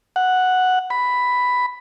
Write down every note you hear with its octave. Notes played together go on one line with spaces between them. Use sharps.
F#5
B5